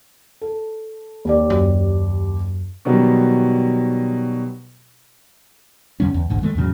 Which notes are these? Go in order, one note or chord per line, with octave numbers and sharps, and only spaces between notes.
A4
D#2 G4 D5
F#2
B2 D#3 F#3 G3 B3
F2 D3 G3 C#4
E2
A1 D2 G#2
D#3 G#3 A3
E2 A2 C#3 F#3